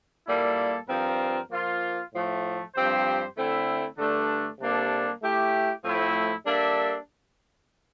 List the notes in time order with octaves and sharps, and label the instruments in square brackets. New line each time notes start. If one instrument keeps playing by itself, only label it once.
[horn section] A#2 G3 A#3 E4 A4
G2 F3 C4 F4 A#4
F3 A#3 F4
A2 F3 A3
G2 F3 C4 G4 C5
D3 A3 C4 E4
G2 D3 A3 D4
C3 G3 A#3 D4 A4
A3 E4 G4
A2 F3 A3 C4 E4
G3 A#3 D4 A4 E5